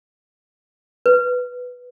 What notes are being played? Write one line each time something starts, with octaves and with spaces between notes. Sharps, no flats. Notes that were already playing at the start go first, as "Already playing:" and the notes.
B4